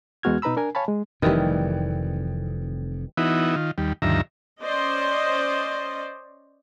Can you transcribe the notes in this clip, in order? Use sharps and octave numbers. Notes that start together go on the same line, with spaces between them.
E2 G#3 B3 F#4 F6 G#6
B2 D#4 B4 A#5 B5 E6
D4 A#4 G#5
C#5 F5 G#5 A5 B5
G#3
F1 F2 D#3 E3 G3
E3 B3 D#4 E4 F#4
D#3 F4
D#2 G3
D2 G2 D#3 F3 E5 A#5
C#4 C5 D5 D#5